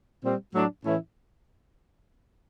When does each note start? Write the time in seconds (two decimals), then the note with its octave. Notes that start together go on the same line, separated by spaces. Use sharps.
0.23 A#2 G3 C4
0.54 A2 F#3 A3 D4
0.84 A2 E3 A3 C#4 E4